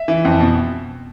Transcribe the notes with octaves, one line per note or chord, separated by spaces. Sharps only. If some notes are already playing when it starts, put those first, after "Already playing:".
Already playing: E5
E3
F2
B2